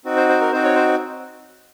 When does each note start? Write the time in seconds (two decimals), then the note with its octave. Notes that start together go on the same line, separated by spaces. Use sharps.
0.05 C4 D#4 F#4
0.16 C5
0.29 C5
0.41 A#4
0.52 C4 D#4 F#4 C5
0.64 C#5
0.75 C5